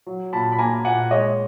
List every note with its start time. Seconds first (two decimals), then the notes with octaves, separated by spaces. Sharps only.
0.06 F#3
0.33 A#2 A5 B5
0.52 B5
0.59 A#3 G#5 A#5
0.85 A#2 F#5 G#5
1.11 G#3 C#5 D#5